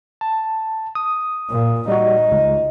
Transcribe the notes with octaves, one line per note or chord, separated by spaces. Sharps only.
A5
D#6
A#2
G3 D#4 F#4
C#2